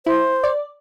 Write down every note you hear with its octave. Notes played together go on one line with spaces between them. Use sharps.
E4 C5
D5